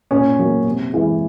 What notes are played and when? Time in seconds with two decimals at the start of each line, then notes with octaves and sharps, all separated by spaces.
0.11 A#2 C#4
0.39 F#3 A#3
0.65 C3
0.93 E3 G#3